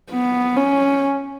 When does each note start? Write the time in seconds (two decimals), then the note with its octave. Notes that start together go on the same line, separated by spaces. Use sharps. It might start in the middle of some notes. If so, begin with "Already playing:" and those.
0.12 B3
0.57 C#4